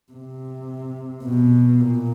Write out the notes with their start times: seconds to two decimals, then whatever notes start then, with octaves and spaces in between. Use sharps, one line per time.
0.12 C3
1.24 B2
1.81 A#2